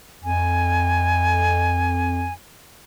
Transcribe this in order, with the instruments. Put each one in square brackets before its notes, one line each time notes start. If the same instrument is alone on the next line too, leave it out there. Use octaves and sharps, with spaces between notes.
[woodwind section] F2 [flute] G#5